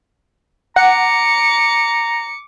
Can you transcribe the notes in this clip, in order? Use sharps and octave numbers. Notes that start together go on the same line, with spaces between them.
F#5 A#5 D6 C#7